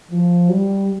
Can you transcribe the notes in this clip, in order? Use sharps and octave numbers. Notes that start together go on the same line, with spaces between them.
F3
G3